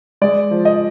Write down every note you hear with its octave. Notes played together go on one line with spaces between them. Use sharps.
G#3 D5
F3
D#5